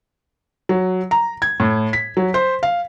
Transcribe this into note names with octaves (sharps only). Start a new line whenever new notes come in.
F#3
A#5
G#6
A2
B6
F#3
C5
F5